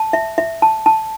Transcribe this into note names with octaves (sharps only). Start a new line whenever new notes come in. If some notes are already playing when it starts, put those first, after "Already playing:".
Already playing: A5
E5
E5
A5
A5